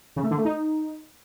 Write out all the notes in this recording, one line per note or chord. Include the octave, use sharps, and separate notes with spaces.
C#3
A3
D3
A3
D#4